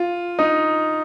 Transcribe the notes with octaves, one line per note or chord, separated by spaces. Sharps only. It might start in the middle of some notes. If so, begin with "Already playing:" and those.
Already playing: F4
D#4